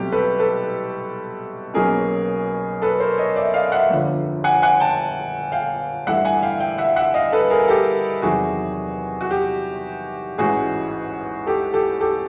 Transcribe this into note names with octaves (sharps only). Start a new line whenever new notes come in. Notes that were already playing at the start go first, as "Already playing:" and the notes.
Already playing: C2 B2 F#3 A3 C4 G4
A4 B4
A4 B4
B1 B2 F#3 A#3 C#4 G#4 A#4
A4 B4
A#4 C5
C#5 D#5
D5 E5
D#5 F5
E5 F#5
G1 F2 D3 F3
F#5 G#5
F#5 G#5
G5 A5
F5 G5
G2 E3 A3 E5 F#5
F#5 G#5
F5 G5
F5 G5
E5 F#5
E5 F#5
D#5 F5
A4 B4
G#4 A#4
G4 A4
E2 C3 D#3 F#3 F#4 G#4
F#4
G4
A1 G#2 E3 G#3 C#4 F#4 G#4
G4 A4
G4 A4
G4 A4